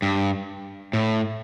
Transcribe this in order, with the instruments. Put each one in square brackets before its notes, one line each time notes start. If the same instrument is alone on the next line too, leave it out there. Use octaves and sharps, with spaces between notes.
[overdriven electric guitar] G2
A2